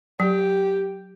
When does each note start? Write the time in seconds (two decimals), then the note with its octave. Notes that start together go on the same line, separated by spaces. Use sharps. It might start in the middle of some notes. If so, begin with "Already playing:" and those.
0.20 F#3 G4